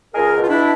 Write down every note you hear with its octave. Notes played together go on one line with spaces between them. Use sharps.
C#2 G#4 A#4
B2
F4
D4 E4